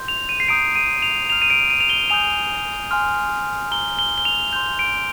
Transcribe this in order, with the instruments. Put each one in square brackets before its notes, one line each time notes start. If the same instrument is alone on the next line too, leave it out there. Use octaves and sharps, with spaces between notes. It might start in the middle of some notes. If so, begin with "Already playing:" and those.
Already playing: [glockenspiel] C6 G6
F7
D#7
C7
A#5 D#6 G6 D7
D#7
F7
A#5 F6 F7
D#7
D7
D#7
F7
G7
G#5 D#6 G6 F7
G#5 C6 F6
A#5 F6 G7
G7
G7
F7
G6 F7
C6
D7